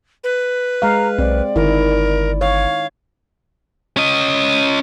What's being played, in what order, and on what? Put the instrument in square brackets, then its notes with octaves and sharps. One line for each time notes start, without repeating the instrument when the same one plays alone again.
[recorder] B4
[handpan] G#3 F5 [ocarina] A#5
[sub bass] B1 [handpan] C4 [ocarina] D5
[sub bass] G1 [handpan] D#3 E4 [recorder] A#4
[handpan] C#5 [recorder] F5
[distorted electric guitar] C#4 D#5